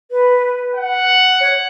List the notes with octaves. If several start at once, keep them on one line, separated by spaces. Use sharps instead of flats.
B4
F#5
C#5